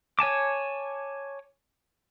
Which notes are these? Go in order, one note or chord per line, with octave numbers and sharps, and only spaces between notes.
C#5 G#5 A5 D6